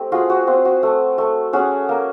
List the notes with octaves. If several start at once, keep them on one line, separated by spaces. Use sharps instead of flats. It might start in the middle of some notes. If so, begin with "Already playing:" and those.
Already playing: A3 C4 G4
F4 F#4 G#4
F#4
C4 F4
F#4
A3
A3
C#4 F#4 G#4
A#3